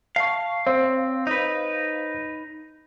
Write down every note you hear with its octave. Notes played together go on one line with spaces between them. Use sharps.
F5 A5 C#6
C4 C5 C#5 F5
D#4 B4